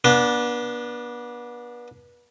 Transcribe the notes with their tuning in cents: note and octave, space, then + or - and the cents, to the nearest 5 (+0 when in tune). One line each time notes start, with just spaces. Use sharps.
B3 -35 D4 +0